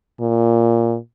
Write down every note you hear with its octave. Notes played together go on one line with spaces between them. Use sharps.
A#2